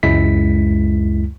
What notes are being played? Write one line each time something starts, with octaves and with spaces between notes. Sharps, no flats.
C#2 F#2 G#3 E4 B6